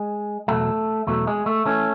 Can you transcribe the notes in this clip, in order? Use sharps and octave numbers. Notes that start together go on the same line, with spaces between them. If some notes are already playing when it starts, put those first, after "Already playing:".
Already playing: G#3
E2 B2 F#3 A3
E2 B2 F#3 A3
G#3
A3
E3 A3 C#4